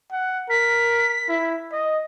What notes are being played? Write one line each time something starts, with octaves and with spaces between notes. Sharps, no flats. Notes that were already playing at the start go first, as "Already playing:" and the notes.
F#5
A#4 B6
E4
D#5